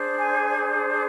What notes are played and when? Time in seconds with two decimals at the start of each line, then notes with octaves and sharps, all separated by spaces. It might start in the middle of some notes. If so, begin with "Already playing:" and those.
Already playing: D4 G#4 C5
0.19 G#5